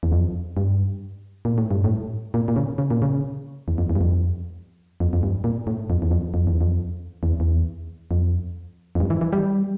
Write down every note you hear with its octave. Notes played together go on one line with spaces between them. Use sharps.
E2
F2
G2
A#2
A2
G2
A2
A#2
A#2
C#3
C#3
A#2
C#3
E2
F2
E2
G2
F2
F2
F2
G2
A#2
A2
F2
E2
F2
F2
E2
F2
E2
E2
F2
F2
G2
E3
E3
G3